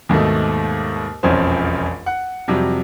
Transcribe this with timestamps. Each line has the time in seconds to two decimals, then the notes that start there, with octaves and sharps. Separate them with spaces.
0.09 D#2 G#2 B2 A3
1.23 E1 A#1 F2 C4 C#4 C5
2.06 F#5
2.48 F2 C3 F#3 G3